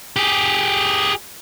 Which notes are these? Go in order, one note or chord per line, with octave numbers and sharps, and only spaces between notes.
G4 G#4